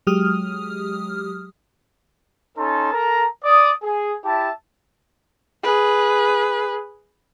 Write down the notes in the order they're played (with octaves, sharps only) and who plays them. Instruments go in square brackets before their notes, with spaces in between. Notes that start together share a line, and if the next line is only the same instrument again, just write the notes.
[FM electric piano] F#3 G#3 G4 D#6 F6
[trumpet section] C#4 D#4 A4 A5 C6
A4 A#4 A#5
D5 D#6
G#4
E4 G4 E5 A5
[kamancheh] G#4 B4